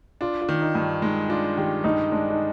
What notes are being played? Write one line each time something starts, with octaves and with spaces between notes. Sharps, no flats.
D4 F4
F4
D#3
D#4
G2
F4
G#3 D#4
D4 F4
D#3 G4
G2 D#4
G#3 D4
D#4